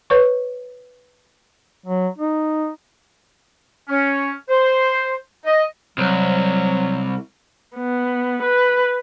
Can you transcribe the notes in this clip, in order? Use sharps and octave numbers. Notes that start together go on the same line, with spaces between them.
B4 C#5 C#6
F#3
D#4
C#4
C5
D#5
C2 F#3
B3
B4